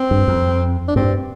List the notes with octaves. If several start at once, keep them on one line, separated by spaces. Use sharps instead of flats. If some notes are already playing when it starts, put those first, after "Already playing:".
Already playing: C4
G2
F2
D4
G2 C4